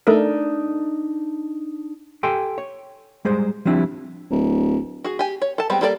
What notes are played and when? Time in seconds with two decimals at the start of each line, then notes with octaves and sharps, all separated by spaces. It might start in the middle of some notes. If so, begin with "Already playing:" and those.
0.07 A3 D4 D#4 A4 A#4
2.23 G4 A4 G5 G#5 C6
2.58 C#5
3.25 G3 G#3 G#4 C5
3.65 F3 G3 C4 D4 E4
4.30 D1
5.04 F#4 G#4
5.19 G4 G#5
5.42 C#5
5.58 A4 A5
5.70 G3 G#3 B3 C4
5.81 G3 A#3 A4 C#5 D5